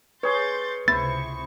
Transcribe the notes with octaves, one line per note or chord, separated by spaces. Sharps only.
G#4 B4 C#5 C6 G6 A6
C#2 C3 E4 C5 C#6 A6